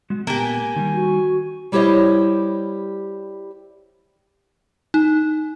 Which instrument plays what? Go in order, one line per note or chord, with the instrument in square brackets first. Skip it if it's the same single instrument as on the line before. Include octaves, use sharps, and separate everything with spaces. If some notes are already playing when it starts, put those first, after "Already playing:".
[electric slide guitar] G#3 F#4
[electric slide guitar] A#2 B3 A5 [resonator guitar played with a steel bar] A#3 G4
[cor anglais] G#5
[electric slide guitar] D#3 G3
[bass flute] F#4
[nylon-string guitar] G3 E4 G4 C5 C#5 D#5
[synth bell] D#4